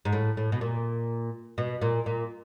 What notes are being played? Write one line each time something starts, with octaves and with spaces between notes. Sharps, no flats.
G#2
A2
A2
B2
A#2
B2
A#2
A#2